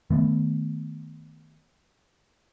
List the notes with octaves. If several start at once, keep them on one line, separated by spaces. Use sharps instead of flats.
D#3 A3 B3